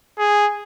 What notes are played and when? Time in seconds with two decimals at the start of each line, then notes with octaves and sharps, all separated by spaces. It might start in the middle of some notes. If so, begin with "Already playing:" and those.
0.19 G#4